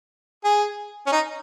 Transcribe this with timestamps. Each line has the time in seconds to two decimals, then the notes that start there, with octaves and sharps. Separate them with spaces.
0.45 G#4
1.07 C#4
1.12 D#4